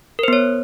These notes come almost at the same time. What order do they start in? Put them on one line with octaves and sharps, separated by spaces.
A#4 C5 B3 C#5